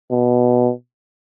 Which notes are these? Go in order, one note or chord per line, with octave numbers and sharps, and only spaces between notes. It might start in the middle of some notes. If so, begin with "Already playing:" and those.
B2